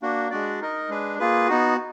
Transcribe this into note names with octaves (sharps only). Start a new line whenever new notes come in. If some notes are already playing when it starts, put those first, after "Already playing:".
A#3 D4 F#4
G#3 D4 F#4 D5
D#4 A#4 D#5
G#3 D4 G#4 B4
A#3 F4 G#4 B4
B3 D#4 F#4